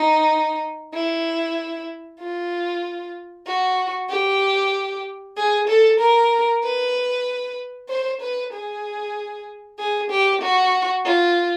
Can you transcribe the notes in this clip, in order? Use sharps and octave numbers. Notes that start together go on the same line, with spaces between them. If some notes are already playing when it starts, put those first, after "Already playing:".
Already playing: D#4
E4
F4
F#4
G4
G#4
A4
A#4
B4
C5
B4
G#4
G#4
G4
F#4
F4